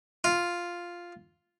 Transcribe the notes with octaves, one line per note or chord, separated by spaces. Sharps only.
F4